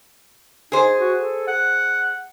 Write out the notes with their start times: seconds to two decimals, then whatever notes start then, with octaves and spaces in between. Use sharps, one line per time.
0.72 D#4 G#4 C5
0.98 F#4
1.18 A4
1.47 F#5